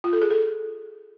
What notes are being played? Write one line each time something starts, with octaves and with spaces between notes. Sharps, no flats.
F4
A4
G#4
A4